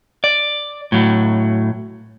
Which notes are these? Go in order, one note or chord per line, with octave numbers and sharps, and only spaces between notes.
D5
A2 F#3